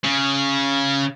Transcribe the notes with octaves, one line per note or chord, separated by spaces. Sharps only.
C#3